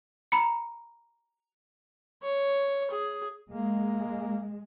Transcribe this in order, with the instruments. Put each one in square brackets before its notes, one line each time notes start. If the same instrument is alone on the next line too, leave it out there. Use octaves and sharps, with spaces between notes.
[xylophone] A#5 B5 C#7
[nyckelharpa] C#5
G#4
[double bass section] G#3 [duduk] A#3